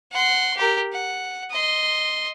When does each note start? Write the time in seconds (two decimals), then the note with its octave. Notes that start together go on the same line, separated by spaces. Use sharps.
0.12 F#5 C6
0.57 G4 A#4
0.92 F#5
1.51 D#5 C6